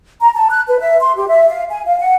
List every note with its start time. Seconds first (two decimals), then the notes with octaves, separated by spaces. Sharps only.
0.21 A#5
0.35 A5
0.50 F#6
0.68 B4
0.80 E5
1.00 C6
1.16 G4
1.28 E5
1.48 F5
1.70 G#5
1.86 F5
1.99 F#5